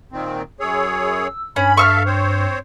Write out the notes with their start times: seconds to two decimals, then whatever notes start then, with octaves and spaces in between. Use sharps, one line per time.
0.12 A#2 D#3 C4
0.60 F#2 G#4 C#5 E6
1.56 G2 C#4 B5
1.77 A4 E5 F5 C#6 E6 F6
2.06 C4 C5 C#5